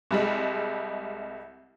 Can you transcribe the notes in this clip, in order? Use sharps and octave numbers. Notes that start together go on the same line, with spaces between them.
C2 G3 G#3